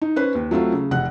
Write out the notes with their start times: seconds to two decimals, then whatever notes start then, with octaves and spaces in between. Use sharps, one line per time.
0.02 D#4
0.16 C#4 B4 C5
0.35 D#2
0.51 F#3 A3 C4 F4
0.72 C#3
0.91 F1 F#5 F#6